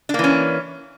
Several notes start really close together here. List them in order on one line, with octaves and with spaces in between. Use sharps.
D4 A#3 E3 C#4